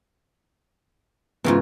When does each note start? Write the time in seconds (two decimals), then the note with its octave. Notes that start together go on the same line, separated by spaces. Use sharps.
1.44 G#2 C#3 E3 B3 F4